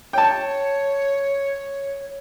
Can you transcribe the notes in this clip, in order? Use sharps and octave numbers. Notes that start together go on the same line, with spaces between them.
C#5 G5 A5